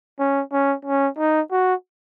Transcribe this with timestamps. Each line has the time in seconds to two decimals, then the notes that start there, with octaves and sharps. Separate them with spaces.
0.19 C#4
0.52 C#4
0.85 C#4
1.18 D#4
1.51 F#4